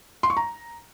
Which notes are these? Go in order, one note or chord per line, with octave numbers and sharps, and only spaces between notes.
C6
C#6
A#5